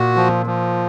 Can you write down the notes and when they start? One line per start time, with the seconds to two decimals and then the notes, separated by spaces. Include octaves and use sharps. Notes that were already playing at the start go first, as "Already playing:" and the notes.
Already playing: A#2 F#4
0.16 F3
0.46 F3